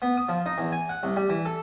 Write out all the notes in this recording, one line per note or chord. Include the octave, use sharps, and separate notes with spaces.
B3
D#6
F3
D#4
E2
G#5
F#5
C2
G3
E3
A4